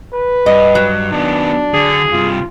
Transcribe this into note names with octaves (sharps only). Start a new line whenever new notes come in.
B4
G2 D#5
F#3
D#3 B3 D4
D3 G#4
G2 C3 F4